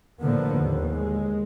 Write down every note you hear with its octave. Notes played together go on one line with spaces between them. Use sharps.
A2 D3 F3 A#3 B3
D#2
G#3